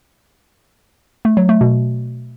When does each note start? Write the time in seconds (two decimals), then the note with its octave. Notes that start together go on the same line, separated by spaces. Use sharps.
1.25 A3
1.37 F#3
1.49 A3
1.61 B2